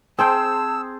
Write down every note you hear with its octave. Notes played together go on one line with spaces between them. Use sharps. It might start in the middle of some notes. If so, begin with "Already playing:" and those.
C4 G#4 A4 C5 G5 A5 E6